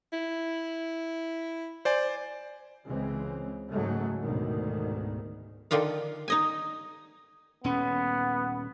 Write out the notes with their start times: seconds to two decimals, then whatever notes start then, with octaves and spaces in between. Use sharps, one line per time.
0.13 E4
1.85 C5 D5 G#5
2.86 C#2 E3 G#3 C4
3.71 F#1 C#2 G#2 F#3 G#3 A3
4.22 A1 D2 G#2 B2 D#3
5.71 D3 D#3 D4 F4 F5
6.28 D#4 D#5 G#5
7.64 D#1 B3 C#4